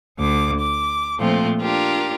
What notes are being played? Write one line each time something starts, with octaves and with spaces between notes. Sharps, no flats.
D2 D6
D6
A#2 F3 A3 C4 F4
D4 F4 G4 A#4